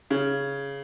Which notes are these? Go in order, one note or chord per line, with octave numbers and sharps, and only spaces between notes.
C#3